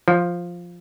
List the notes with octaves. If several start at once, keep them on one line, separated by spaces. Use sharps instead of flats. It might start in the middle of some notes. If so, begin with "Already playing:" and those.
F3